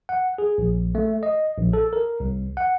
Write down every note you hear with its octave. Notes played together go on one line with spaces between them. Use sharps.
F#5
G#4
A#1
A3
D#5
A#1
A4
A#4
C2
F#5